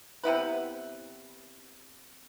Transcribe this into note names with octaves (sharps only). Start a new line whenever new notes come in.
C3 B3 E4 B4